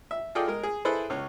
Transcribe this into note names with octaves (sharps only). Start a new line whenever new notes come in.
E5
F4 G#4 A4 D5 D#5 G5
G#3 A#4
G#4
E4 G#4 A4 B4 C5
C#2 C#4